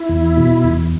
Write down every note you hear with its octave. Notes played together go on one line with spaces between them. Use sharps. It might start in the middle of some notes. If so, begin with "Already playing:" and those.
Already playing: E4
E2
B2
E2